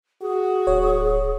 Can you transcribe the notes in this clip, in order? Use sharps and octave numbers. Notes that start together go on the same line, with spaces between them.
F#4 G#4
D1 C#5